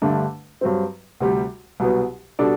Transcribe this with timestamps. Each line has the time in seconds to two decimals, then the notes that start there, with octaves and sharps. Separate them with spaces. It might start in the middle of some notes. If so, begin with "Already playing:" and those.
0.02 G2 D3 A3 D4
0.61 G2 F#3 C4
1.21 D2 C3 G3
1.80 C2 B2 F#3 B3
2.39 B2 G3 D4 A4 D5